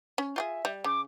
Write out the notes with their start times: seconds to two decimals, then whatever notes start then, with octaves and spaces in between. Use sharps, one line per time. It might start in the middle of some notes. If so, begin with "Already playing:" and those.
0.18 C#4
0.36 F4 G4 G#4 E5
0.65 G3
0.84 C#3 D6